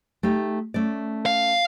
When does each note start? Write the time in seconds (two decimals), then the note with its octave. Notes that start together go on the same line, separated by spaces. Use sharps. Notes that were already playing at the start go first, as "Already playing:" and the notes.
0.23 A3 D#4 G4
0.74 A3 C#4 D5
1.26 F5